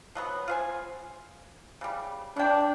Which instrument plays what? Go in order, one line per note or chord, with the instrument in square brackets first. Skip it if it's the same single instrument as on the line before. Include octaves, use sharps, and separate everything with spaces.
[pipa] F3 F#3 B3
F4 C5 G#5
C#3 G3
[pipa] B2 G5 [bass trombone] D4